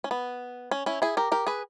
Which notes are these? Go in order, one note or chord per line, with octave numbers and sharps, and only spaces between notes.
C#4
B3
C#4
C#4 E4
E4 G#4
G4 A#4
G4 A#4
G#4 B4